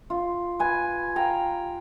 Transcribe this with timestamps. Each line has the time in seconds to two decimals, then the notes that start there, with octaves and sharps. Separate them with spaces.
0.10 F4
0.59 B4 G#5
1.16 F5 G5 A#5